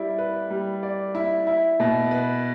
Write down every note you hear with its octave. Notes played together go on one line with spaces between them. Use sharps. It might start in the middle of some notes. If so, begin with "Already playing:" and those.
Already playing: G3 E4 D5
B4
G3
D5
E4
E4
B2
B4